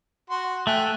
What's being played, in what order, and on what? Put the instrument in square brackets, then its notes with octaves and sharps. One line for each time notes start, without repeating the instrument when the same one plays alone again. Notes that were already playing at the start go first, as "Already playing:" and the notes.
[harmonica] F#4 C6
[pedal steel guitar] A3 [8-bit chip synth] E5 G5 F#6 [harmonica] G#5